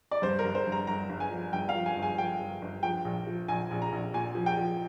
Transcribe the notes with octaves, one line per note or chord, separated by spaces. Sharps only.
D5
G2 C5
A#4
G1
C5
G1
A#5
G1 A#5
G1
G#5
F3
G1 G5
F5
F3
G#5
G1
G#5
F3 G5
G1
G1
F3 G5
A#1
F3
A#1 G#5
A#1
A#5
A#1
A#2 G#5
F3
G5
F3